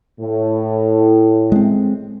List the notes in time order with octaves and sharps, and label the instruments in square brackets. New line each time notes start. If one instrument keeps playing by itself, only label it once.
[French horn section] A2
[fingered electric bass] G#3 C4